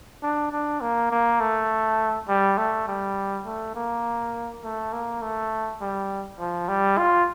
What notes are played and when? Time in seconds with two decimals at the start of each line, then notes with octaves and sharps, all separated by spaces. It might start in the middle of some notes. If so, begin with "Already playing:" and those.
0.23 D4
0.52 D4
0.81 A#3
1.11 A#3
1.40 A3
2.28 G3
2.58 A3
2.88 G3
3.46 A3
3.75 A#3
4.64 A3
4.93 A#3
5.22 A3
5.81 G3
6.40 F3
6.69 G3
6.98 F4